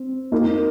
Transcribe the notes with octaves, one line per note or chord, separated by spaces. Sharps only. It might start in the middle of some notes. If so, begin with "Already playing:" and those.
Already playing: C4
A#3 D#4